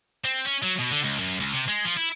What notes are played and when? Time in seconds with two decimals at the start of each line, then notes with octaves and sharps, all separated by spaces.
0.24 C4
0.45 C#4
0.63 F#3
0.79 B2
0.91 D3
1.04 C#2
1.20 F#2
1.40 C#2
1.54 C3
1.68 G#3
1.84 F3
1.97 E4